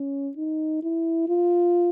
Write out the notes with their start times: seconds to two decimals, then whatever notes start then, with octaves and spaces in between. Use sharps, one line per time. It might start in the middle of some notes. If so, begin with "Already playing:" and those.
Already playing: C#4
0.37 D#4
0.83 E4
1.28 F4